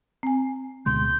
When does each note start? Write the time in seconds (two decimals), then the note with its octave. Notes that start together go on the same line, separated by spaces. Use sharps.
0.23 C4 G#5
0.86 D2 B2 G#3 C6 G6